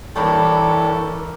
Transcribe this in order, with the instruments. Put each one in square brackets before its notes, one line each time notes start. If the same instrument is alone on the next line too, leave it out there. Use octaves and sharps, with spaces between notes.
[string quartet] E3 [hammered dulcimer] G3 A#3 B5 [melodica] D4 C#5 G5 [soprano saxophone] A4